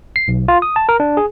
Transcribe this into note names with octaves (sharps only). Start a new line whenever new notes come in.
C7
B1
F4
D#6
A5
A#4
D4
G#4